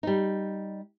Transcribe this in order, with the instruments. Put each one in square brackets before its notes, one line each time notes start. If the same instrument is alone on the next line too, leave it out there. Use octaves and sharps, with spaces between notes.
[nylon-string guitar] G3 D#4